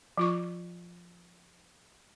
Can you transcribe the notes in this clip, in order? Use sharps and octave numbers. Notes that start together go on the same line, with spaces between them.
F3 F4 C#6